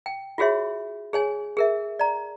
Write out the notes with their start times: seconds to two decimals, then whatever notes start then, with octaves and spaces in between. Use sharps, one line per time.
0.06 G5
0.38 F4 F#4 G#4 C#5 E5
1.13 G#4 C#5 G#5
1.57 G#4 A#4 E5
1.99 D5 A#5